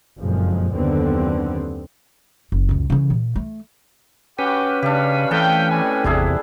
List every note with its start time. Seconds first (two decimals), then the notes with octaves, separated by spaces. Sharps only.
0.18 F#1 F2 A#2 F3 G#3
0.74 F#1 D#2 D3 B3 C4
2.52 F#1
2.69 C#2 F#2
2.90 C#3 E3
3.10 A#2
3.36 A3
4.39 C#4 F#4 G4 B4
4.82 C#3 G3 D4 G4 F5
5.31 A2 C3 E3 F5 G5 A5
5.71 G3 G#3 G#5
6.04 G#1 E2 C3 D4 E4 G#4